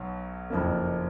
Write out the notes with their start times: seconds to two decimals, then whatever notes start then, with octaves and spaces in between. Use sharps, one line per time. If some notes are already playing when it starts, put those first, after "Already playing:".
Already playing: B1 B2 F#3
0.50 F#1 F2 F3 A#3